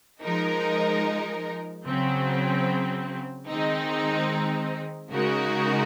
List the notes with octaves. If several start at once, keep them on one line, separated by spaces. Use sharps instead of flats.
F3 G#3 D#4 A#4
C#3 F#3 C4
D#3 G#3 C4 D#4
C#3 G#3 D#4 F#4 A#4